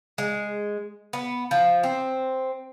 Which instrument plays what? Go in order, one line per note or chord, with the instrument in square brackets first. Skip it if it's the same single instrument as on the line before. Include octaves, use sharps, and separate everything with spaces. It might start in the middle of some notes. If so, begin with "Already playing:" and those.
[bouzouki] G#3
B3
F3
C4